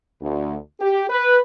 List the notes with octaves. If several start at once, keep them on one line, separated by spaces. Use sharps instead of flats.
D2
G4
B4